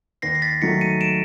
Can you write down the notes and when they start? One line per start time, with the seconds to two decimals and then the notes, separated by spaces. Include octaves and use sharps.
0.22 D#2 A#6 C7
0.35 C7
0.42 A6 B6
0.62 D#3 F#3 A3 B6 C#7
0.81 C#7 D#7
1.01 D7 E7